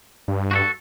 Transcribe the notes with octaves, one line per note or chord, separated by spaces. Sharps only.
G2
F#4 G4 A4